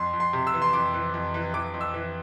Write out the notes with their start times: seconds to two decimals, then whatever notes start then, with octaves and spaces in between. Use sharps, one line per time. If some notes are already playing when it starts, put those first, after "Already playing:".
Already playing: F2 C6
0.14 F2
0.20 C6
0.33 C3
0.47 E6
0.54 E3
0.62 C6
0.73 F2 D6
0.94 E3
1.14 F2
1.34 E3
1.54 E3 D6
1.74 F2
1.81 E6
1.94 E3